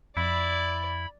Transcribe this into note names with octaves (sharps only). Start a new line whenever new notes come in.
F2 E4 D5 B5